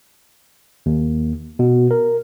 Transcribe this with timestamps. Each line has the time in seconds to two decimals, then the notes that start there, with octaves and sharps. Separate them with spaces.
0.86 D#2
1.59 B2
1.91 A#4